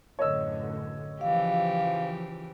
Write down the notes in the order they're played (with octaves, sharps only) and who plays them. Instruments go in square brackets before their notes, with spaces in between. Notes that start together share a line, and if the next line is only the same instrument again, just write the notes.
[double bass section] A1 F#2 D3 [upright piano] C#5 D#5 E6
[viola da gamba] C#3 E3 G4 [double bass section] F3 [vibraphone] F5